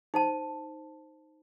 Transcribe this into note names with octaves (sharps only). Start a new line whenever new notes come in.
D#4 C5 A5